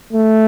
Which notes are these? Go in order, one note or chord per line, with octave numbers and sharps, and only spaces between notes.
A3